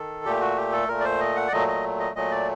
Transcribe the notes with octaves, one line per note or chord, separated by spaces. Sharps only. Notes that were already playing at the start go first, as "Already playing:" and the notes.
Already playing: D#3 A4
A#2 A3 G4
F#4
G4
A4
A#2 A3 A#4
D5
C5
D#5
F#5
D5
A#2 F#3 A3 D#5
D#5
D#5
A#2 F#3 A3 D#5
D5